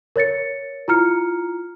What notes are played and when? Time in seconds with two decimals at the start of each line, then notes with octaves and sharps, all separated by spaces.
0.16 A#4 C#5 A6 C#7
0.88 E4 F4 A#5 F6 C#7